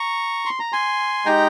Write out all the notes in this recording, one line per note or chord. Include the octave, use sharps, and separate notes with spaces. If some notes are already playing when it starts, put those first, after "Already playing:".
Already playing: A#5 C#6
C6
A#5
G#5 C6
G#3 D#4 G4 G5 A#5